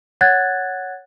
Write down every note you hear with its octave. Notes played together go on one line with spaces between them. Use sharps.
C#5 F#5 F#6 G#6 A6